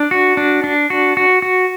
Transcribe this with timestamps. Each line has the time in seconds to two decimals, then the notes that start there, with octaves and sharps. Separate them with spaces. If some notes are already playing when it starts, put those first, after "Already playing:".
Already playing: D4
0.11 F#4
0.37 D4
0.64 D4
0.90 F#4
1.17 F#4
1.42 F#4